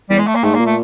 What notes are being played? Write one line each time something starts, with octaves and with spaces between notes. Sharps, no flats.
E2 G3
G#3
A3
A#3
G#2 A3
A#2 A#3
A3